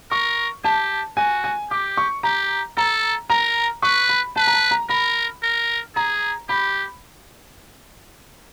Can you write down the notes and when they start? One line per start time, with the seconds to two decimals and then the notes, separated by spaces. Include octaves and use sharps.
0.11 A#4 C#6
0.64 G4 A5
1.17 F#4 G#5
1.44 G#5
1.71 G4 D6
1.97 C#6
2.23 G4 A#5
2.77 A4 A#5
3.30 A#4 A#5
3.82 B4 C#6
4.09 B5
4.36 B4 A5
4.47 A#5
4.53 A5
4.71 A#5
4.89 A#4 B5
5.43 A#4
5.95 G#4 A#5
6.49 G4 B5